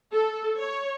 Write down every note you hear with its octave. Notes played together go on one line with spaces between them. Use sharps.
A4
C#5